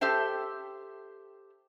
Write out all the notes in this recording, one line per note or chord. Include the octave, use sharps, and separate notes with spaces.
G4 A4 C5 E5 G5